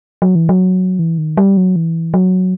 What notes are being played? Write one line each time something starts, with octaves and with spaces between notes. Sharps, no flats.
F#3
E3
F#3
E3
D#3
G3
F#3
E3
F#3